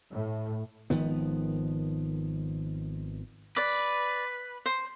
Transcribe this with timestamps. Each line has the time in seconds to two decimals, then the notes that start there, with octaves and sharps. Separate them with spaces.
0.10 A2
0.90 G#1 D#3 F3 B3
3.56 B4 D5 D6
4.66 C5